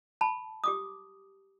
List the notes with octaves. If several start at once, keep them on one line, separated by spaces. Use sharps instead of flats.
A5 B5
G4 D6 D#6